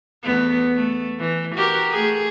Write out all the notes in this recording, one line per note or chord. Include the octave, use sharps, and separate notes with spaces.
E2 A3 B3
A3
E3
F#4 G4 A#4
A3 G#4